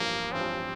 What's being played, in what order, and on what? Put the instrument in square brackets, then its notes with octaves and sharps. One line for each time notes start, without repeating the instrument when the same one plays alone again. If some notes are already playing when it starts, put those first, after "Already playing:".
Already playing: [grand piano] A1 G2 F3 [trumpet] A#3
[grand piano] A1 G2 F3 [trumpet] C4